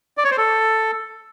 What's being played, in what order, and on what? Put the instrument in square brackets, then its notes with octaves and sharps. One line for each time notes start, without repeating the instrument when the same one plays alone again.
[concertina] D5
C#5
C5
A4